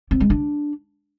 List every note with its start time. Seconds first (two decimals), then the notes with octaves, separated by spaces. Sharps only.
0.11 C4
0.20 G#3
0.30 D4